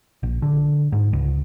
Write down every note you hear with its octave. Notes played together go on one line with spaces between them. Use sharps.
A#1
D3
G#2
C#2